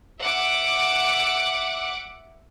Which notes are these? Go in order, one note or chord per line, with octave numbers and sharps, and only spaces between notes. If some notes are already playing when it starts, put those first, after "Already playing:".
E5 F#5 D6